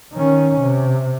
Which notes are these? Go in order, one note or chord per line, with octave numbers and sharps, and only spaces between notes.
D#3 C#4
C3